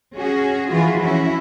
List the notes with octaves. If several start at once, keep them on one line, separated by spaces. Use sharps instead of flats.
C#4 F#4 G#4
E3 F3 F4 F#4 G#4 B4
C#4 E4 F#4